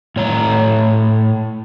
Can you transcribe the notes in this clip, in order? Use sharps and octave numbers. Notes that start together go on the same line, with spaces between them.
A2 C#5 A#5